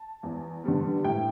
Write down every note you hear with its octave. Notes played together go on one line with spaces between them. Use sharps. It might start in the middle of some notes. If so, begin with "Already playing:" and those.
Already playing: A5
E2
D3 G3 B3
A2 G5